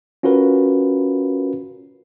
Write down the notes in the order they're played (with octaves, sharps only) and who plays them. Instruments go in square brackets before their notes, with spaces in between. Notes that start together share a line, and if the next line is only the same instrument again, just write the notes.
[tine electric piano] C#4 F4 F#4 A#4 B4